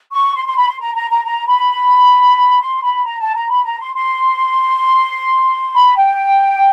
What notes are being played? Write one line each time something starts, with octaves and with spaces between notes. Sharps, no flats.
C#6
C6
C6
B5
C6
A#5
A#5
A#5
A#5
B5
C6
B5
A#5
A5
A#5
B5
A#5
C6
C6
B5
G5